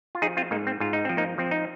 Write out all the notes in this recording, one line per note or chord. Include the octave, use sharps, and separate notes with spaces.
F4
F3 D#4 G#4
C4 F4
G#2 A#3 D#4
C4
G#2 F4
D#4
F3 C4
A#3 D#4
F3 C4
D#4